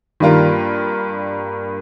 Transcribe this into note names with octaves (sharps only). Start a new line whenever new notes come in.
G2 D#3 G3 A#3 F4 A#4